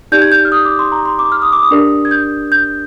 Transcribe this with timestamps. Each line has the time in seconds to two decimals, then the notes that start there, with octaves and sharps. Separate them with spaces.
0.12 D#4 G4 D5 G6
0.22 G#6
0.32 G6
0.45 F6
0.52 D#6
0.65 D6
0.79 C6
0.92 A#5
1.05 C6
1.19 D6
1.32 F6
1.42 D#6
1.53 D6
1.63 D#6
1.71 D4 G4 A#4 D5
2.05 G#6
2.11 G6
2.52 G6